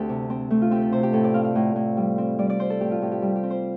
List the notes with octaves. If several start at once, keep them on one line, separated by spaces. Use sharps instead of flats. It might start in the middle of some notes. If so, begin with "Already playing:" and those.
Already playing: D2 A3 C4 G4 A4
C3
C4
A3
F4
C4 G4
A4
C3 C5
G4
A2 A4
D5
C4 F5
F5
A2
A2
G3
C4
G3 D5
D5
C4 C5
A4
A2 G4
F4
A2 G4
G4
G3
G4
C4
C5